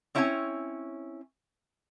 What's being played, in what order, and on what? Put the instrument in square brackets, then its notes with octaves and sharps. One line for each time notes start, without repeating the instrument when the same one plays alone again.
[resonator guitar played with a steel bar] C4 C#4 E4 C#5 G5 G#5